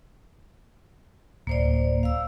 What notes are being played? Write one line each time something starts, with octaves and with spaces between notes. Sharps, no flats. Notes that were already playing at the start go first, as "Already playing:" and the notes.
D1 A#3 C5 D5
F5 E6